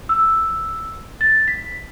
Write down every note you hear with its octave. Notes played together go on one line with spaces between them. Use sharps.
E6
A6
B6